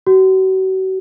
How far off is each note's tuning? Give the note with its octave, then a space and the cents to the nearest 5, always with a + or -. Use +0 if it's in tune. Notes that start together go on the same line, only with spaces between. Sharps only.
F#4 +40